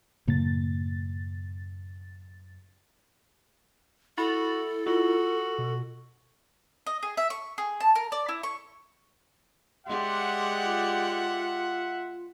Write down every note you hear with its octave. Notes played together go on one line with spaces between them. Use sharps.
F#2 A2 C#3 A#3 A6
E4 F#4 A4 B5 A6
F4 F#4
B2
D#5
G#4
E5
C#6
G#4
A5
A#4
D5
E4
C#6
G#3 G4 D5 E5 F#5 C6
F4